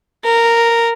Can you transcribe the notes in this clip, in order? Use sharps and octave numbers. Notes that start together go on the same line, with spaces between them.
A#4